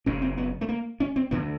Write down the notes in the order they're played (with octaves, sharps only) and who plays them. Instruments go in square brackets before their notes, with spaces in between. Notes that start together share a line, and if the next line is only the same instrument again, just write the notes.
[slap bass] F#1 F#2 C#3 C#4
C4
B3
A3
A#3
C#4
C4
D2 D3 B3